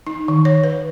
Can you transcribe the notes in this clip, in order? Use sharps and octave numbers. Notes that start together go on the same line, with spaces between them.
D#4
D#3
C#5
B4